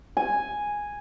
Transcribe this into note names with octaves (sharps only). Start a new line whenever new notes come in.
G#5